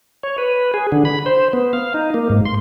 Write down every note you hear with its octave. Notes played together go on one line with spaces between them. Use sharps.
C#5
B4
G#4
D3
B5
C5
B3
F5
D#4
A#3
G#2
C6